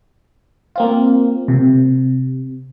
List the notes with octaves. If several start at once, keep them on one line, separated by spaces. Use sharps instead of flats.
A#3 C4 F4
C3